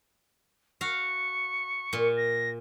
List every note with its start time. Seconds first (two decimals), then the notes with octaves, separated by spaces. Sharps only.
0.81 F#4 F5 C#6
1.93 A#2
2.17 A#6